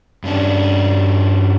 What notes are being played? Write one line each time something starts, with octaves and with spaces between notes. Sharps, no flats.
G2 C#4 D4